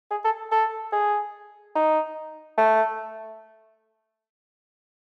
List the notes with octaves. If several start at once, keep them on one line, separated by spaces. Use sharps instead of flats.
G#4
A4
A4
G#4
D#4
A3